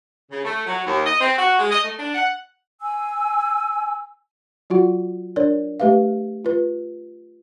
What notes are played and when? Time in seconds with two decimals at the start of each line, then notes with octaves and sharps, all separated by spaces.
0.31 C#3
0.43 A3
0.66 F#3
0.85 D#2
1.05 D#5
1.19 C4
1.36 F#4
1.58 G#3
1.70 D#5
1.83 A3
1.98 D4
2.14 F#5
2.81 G#5 E6
4.70 F#3 F4 F#4 F#5
5.36 D4 A#4 C#5 D5
5.80 A3 G4 B4 E5 F5
6.45 F4 B4